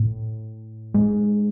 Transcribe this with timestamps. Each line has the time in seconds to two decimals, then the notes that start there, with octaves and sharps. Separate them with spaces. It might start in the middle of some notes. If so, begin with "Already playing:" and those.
Already playing: A2
0.94 G#3